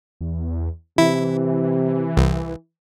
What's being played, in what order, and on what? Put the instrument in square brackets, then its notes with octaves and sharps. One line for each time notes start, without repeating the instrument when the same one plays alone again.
[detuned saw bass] E2
[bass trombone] C3 [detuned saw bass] E3 [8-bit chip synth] E4
[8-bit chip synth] C2